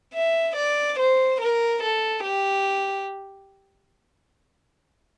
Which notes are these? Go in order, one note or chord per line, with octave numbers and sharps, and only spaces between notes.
E5
D5
C5
A#4
A4
G4